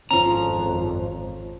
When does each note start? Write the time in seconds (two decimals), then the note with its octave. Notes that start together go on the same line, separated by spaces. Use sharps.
0.11 G#1 F2 F3 C#4 A#5